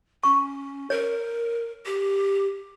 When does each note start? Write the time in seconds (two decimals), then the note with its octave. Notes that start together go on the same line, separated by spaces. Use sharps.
0.23 C#4 C#6
0.90 A#4 C#5
1.86 G4